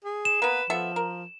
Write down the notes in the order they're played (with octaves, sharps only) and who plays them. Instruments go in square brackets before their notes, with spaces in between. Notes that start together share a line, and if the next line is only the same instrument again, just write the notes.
[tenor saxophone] G#4
[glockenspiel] E7
[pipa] A#3 B3 [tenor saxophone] B4
[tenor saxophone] F3 [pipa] B3 A4 E5
[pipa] A#4